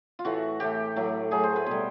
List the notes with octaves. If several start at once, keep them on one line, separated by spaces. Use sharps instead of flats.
F4
A2 E3 A3 F#4
A2 E3 A3 G4
A2 F#3 A3
A2 F#3 A3 G#4
C5
B4
B2 G3 C5